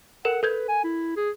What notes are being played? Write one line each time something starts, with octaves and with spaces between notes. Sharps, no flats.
A4 A#4 F#5 E7
A4 B4 G6 G#6
G#5
E4
G#4